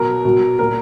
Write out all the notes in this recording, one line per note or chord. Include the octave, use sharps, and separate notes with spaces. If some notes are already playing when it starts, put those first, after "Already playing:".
Already playing: B2 F#3 A#4
B2 F#3
A#2 F#3 A#4